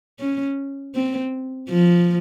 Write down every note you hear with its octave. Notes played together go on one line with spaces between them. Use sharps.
C#4
C4
F3